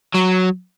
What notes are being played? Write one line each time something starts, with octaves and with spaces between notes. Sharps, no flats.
F#3